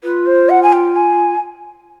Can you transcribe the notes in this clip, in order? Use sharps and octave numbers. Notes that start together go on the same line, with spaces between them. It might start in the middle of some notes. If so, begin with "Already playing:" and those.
F4 B4
C5
F#5
G#5
G5
G#5